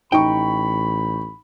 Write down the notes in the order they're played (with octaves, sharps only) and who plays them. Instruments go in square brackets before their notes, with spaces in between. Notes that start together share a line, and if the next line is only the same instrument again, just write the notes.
[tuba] A1 [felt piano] D#4 C#6 [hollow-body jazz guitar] G5 [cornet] B5